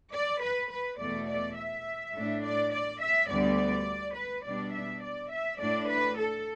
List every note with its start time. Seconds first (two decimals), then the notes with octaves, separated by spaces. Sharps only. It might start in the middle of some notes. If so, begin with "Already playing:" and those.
0.13 D5
0.42 B4
0.70 B4
0.99 E2 B2 A3 D5
1.28 D5
1.57 E5
2.14 A2 A3 D4
2.43 D5
2.72 D5
3.01 E5
3.29 D2 D3 G3 B3 D5
4.16 B4
4.44 B2 G3 D4 D5
4.73 E5
5.02 D5
5.31 E5
5.59 A2 A3 D4 D5
5.88 B4
6.17 A4